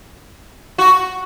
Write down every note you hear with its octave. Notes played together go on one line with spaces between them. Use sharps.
F#4